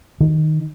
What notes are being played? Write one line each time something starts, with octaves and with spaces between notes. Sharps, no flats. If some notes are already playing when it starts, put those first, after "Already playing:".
D#3